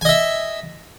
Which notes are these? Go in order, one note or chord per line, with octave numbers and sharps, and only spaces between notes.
D#5 E5 G#5